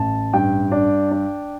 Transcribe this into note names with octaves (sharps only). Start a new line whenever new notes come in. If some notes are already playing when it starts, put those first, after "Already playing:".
Already playing: A1 A5
G2 G5
D4
D4